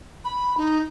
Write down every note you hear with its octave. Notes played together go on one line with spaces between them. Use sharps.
B5
D#4